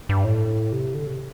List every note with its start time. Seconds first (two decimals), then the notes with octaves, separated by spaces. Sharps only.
0.09 G2
0.24 A2
0.72 C3
0.94 D3
1.07 C3